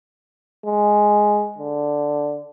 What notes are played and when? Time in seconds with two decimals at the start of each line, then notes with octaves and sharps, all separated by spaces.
0.66 G#3
1.58 D3